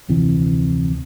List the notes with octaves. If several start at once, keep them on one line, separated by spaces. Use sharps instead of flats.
F1 D2 C3 E3